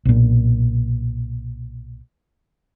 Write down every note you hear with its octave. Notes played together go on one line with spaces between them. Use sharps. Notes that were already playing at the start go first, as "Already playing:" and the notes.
B1 A#2